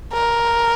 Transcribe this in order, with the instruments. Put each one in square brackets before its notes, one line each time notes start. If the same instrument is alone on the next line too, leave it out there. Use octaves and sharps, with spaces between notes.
[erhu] A#4